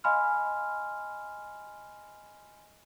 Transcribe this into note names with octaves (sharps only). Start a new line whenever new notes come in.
D#5 F5 G#5 B5 C6 F6